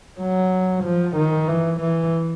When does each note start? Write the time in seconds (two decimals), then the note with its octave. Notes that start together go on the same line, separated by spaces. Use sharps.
0.20 F#3
0.84 F3
1.16 D#3
1.48 E3
1.80 E3